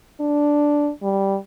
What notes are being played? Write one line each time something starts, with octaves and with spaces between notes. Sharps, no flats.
D4
G3